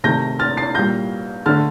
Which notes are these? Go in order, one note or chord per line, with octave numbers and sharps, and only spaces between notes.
C3 D#3 A3 G6 A#6
F6 A6
A6 C7
A#2 G3 G6 A#6
D3 A3 F6 A6